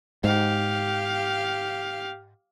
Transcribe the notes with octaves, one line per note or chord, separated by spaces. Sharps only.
G#2 G4 F5